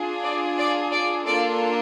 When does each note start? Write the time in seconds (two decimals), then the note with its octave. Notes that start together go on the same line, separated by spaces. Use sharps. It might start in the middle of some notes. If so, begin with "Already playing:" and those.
Already playing: D4 F4 G#4
0.23 D5
0.58 D5
0.92 D5
1.26 A#3 D4 F4 A4 D5